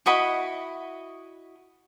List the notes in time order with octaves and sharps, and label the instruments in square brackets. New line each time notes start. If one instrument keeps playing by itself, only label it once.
[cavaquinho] E4 F#4 D#5 B5